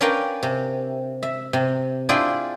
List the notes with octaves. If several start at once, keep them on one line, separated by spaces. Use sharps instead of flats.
C#4 D4 A#4 B4 F5 G5
C3
E5
C3
D4 E4 F4 G#4 D5 G5